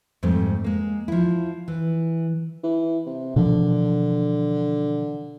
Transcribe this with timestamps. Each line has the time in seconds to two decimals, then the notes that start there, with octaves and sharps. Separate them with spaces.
0.23 F2 G#2 G3 A3 C4
0.64 G#3 A#3
1.08 F3 E4
1.68 E3
2.63 E3
3.06 C3
3.36 B2 D3 E3 F3